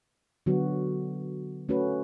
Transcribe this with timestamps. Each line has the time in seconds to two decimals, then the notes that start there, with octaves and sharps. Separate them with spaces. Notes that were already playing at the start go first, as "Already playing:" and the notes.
0.46 D3 F#3 B3 F#4
1.69 A3 C#4 F#4 B4